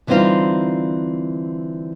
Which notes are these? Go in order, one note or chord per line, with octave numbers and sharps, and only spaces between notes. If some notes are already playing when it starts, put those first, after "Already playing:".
D3 E3 G3 C4 D#4 F4